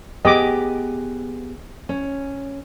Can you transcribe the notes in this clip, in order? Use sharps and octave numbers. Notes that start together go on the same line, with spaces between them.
B3 G4 G#4 D#5 D6
C#4